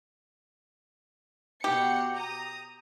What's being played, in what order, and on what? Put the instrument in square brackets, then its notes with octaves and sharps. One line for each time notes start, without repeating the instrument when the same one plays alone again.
[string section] B2 F#5 C#7 [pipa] G4
[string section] A#5 D#6